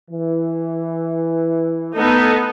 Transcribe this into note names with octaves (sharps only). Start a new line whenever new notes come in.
E3
A3 B3 D#4 A4